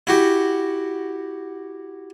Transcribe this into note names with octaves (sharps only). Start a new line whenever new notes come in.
E4 F#4 G4